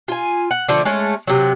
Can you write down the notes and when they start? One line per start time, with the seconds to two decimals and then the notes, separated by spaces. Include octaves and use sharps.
0.08 F4 G#5
0.51 F#5
0.68 D3 F3 A3
0.85 G#3 A3 C#4
1.27 C3 F#3